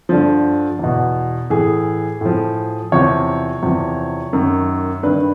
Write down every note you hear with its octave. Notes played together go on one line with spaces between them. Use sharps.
G2 D3 F3
E2 B2
A2 E3 G#4
A2 F3
E2 C3 F3 C#5
E2 C3 F3
F#2 D#3
G2 D#3 B4